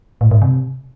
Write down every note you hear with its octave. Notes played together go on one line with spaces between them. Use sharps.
A2
G#2
C3